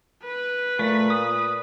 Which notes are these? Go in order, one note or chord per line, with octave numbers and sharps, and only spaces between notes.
B4
A#2 A3
D#6